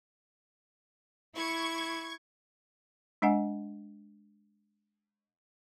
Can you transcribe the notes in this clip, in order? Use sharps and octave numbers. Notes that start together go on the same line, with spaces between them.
E4 C#6 G#6
G#3 D4 D#5 F#5 G#5